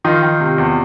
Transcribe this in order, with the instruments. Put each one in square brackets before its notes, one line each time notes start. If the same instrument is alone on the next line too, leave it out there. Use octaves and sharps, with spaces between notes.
[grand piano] D#3 D#4 F4
D#3
C3
E2